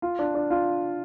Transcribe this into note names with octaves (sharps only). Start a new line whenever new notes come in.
F4
D4
D4
F4